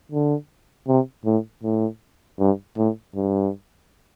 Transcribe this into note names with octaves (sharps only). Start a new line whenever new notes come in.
D3
C3
A2
A2
G2
A2
G2